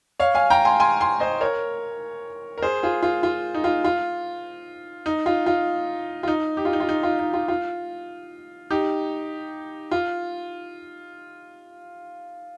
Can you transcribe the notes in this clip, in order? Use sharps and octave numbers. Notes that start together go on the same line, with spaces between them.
C#5 F5
F5 G#5
G5 A#5
G#5 C6
G#5 C6
G#5 C6
C5 D#5
A#4 C#5
A#4
G#4 C5
F4 G#4
F4
F4
D#4
F4
F4
D#4
F4
F4
F4
D#4
G4
F4
D#4
F4
D#4
F4
D#4
F4
F4
D#4 G4
F4